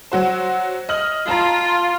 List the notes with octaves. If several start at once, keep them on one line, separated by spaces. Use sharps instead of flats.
F#3 F#4 C5
D#5 F6 F#7
F4 A5 A#5